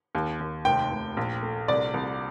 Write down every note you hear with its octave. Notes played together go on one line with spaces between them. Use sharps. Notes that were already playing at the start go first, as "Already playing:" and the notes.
D#2
D#2
F1 G5
F1
A#1
A3
C2 D5
C2